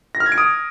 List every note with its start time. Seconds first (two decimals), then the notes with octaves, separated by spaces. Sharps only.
0.15 A#6
0.20 F6
0.26 G#6
0.32 D7
0.38 D#6